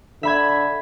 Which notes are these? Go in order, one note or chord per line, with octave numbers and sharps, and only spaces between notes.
D3 E5 B5 G#6